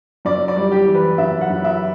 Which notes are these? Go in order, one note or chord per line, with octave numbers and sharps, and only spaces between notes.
F#2 D5
D5
G3
G4
E3
B4
F#2 E5
F#5
F#2
E5